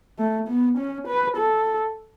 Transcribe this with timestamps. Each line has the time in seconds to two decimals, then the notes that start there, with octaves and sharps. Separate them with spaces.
0.19 A3
0.48 B3
0.78 C#4
1.07 B4
1.37 A4